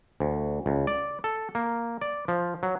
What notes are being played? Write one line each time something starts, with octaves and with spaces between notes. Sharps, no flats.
D2
C#2
D5
A4
A#3
D5
F3
F#3